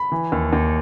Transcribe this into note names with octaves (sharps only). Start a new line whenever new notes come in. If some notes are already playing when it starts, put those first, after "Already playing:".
Already playing: B5
E3
D#2
D#2